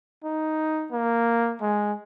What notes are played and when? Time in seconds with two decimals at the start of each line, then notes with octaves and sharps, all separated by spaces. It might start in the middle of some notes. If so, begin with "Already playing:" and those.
0.24 D#4
0.92 A#3
1.61 G#3